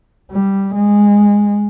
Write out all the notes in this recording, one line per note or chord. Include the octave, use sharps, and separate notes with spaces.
G3
G#3